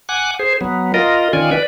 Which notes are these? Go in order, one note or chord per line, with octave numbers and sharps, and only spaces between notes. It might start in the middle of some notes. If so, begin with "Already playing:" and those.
F#5 G#5 D6 F#6
G#4 C5
F#3 B3
F4 A#4 D#5
D#3 C#4 F4 D5 G#5
B4 D5